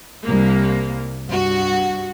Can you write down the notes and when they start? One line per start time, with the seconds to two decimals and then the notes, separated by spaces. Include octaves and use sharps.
0.25 C2 A#3
1.28 G2 F#4